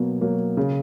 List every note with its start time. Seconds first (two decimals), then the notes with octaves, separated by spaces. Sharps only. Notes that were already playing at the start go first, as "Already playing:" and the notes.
Already playing: B2 F#3 A#3
0.21 F#3 A#3
0.57 C#3